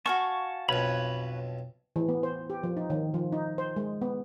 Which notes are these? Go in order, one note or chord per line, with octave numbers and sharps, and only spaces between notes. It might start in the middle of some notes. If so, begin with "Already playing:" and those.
F#4 F5 G#5 A5 C#6
B1 F2 B4 C#5 B5
E3
B3
C5
G4
F3
D#4
D#3
F3
D#4
C5
G#3
B3